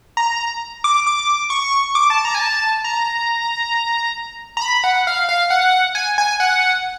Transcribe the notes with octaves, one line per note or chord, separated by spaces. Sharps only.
A#5
D6
D6
C#6
D6
A5
A#5
G#5
A5
A#5
A#5
B5
F#5
F5
F5
F#5
G#5
G#5
F#5